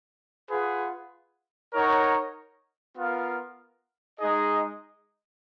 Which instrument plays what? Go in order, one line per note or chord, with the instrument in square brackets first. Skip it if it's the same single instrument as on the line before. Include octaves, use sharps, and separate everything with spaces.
[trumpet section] F4 G#4 B4 F#5
D#4 A#4 C#5 F#5
B3 F4 A#4 F5
G#3 D#4 G#4 D#5